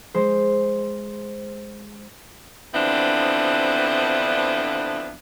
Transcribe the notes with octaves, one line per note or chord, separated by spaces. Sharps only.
G#3 C5
D3 E3 F3 B3 C4 D4